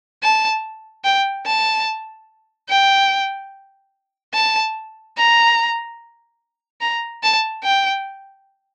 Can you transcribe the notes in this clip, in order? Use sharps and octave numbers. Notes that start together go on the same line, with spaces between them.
A5
G5
A5
G5
A5
A#5
A#5
A5
G5